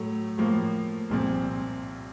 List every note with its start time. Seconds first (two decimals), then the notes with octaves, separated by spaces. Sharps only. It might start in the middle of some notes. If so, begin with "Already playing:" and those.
Already playing: A2 F#3 A3
0.38 A2 F3 A#3
1.09 C2 A#2 F3 C4